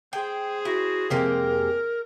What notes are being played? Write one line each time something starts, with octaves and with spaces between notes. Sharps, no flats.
G#4 C5 G5
E4 F#4
F2 C3 G#3 A#3 G4 A#4